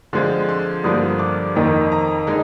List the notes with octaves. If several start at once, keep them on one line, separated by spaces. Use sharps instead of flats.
D3 F3 G#3 C4 F4 C6
C6
G2 D3 F3 A#3 F4 D#6
D6
F2 D#3 A#3 D#4
A#5
D3 G#3 D#4